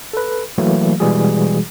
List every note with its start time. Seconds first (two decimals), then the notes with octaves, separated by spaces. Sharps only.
0.13 A4 B4
0.58 E3 F#3 A3 A#3
1.00 B2 E3 G3 G#3 F#4 G#4